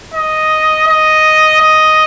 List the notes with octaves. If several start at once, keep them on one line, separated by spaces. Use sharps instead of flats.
D#5
D#5
D#5